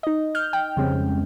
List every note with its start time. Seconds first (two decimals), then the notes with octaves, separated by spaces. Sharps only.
0.03 D#4 D#5
0.35 F6 G6
0.53 G5
0.76 F2 C#3 G3 G#3 C4 C#4